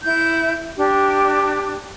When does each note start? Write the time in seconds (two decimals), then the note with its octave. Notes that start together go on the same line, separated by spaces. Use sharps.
0.04 E4 G6
0.77 D4 G4